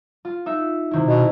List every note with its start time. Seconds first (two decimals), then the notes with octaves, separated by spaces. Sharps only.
0.25 F4
0.46 D#4 E5
0.91 C3 D#3 E4
1.06 B2